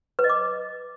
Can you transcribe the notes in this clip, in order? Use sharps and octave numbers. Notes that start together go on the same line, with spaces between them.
B4
D#5
D6